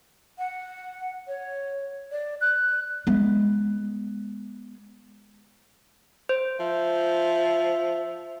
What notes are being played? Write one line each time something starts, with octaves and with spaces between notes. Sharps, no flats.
F#5
C#5
D5
F#6
G#3 B3
C5
F3 E5